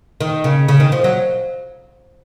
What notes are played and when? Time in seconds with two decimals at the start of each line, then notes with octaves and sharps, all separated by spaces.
0.21 D#3
0.44 C#3
0.68 C#3
0.80 D#3
0.92 F3
1.04 F#3